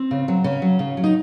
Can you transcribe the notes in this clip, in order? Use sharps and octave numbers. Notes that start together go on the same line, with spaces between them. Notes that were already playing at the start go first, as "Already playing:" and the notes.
Already playing: C4
C#3
F#3
C#3 C#4
F#3
C#3
F#3
D#4